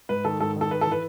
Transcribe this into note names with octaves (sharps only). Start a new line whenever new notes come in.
G#2 B4
D#3 A4
G#2 A4
D#3
A4
G#2 B4
A4
E3 B4